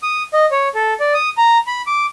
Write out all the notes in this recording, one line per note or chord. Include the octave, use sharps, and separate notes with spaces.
D#6
D#5
C#5
A4
D5
D#6
A#5
B5
D6